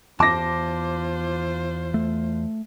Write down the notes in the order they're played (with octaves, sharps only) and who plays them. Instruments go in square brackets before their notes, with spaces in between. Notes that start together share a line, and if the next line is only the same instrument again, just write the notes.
[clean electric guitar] E2 A5 [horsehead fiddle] F4 C5 [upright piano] D6 A#6
[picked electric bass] A3